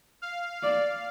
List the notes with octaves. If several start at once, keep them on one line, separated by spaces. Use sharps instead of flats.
F5
D5